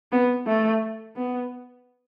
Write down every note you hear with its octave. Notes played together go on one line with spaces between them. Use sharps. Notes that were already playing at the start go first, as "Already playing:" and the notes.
B3
A3
B3